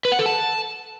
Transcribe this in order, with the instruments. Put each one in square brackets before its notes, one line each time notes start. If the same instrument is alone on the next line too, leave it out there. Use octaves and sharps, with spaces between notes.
[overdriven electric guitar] B4
F#5
A4
A5